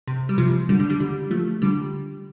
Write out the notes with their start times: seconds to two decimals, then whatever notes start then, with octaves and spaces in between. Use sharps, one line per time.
0.07 C3
0.29 G3
0.38 C3 F3
0.69 D3 G3
0.79 D3 G3
0.90 D3 G3
1.00 D3 G3
1.31 F3 A3
1.62 D3 G3